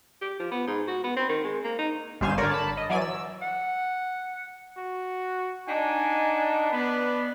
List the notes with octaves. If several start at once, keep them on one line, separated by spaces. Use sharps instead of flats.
G4
F3
B3
G#2
F#4
B3
C4
D#3
G#3
A#3
D#4
G#1 G2 C5 F5 G#5 E7
D3 A#4 C#5 D5
A5 B5
D#5
E3 F#3 D5 G#5 D#7
E6
F#5
F#4
D4 D#4 F#5 G#5
B3 D4 B4